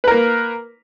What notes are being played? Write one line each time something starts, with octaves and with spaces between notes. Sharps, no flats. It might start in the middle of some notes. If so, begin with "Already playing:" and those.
A#3 A#4 B4